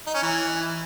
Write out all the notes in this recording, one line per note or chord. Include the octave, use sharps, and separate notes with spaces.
D#4
C#4
E3